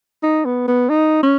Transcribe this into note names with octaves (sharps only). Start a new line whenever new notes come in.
D#4
B3
B3
D#4
C#4